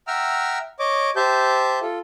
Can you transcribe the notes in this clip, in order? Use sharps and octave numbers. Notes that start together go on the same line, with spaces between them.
E5 F#5 G5 A#5 E6 F6
C#5 D#5 D6
G4 C5 E5 A5 G6
F4 A4